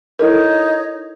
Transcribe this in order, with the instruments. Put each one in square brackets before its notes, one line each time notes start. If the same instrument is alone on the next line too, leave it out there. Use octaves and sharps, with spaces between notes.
[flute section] D#4 C#5 [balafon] E4 A4 A#4